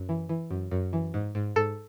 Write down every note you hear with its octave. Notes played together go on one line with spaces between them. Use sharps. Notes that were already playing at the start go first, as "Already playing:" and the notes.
Already playing: F#2
E3
E3
F#2
F#2
E3
G#2
G#2
G#2 A4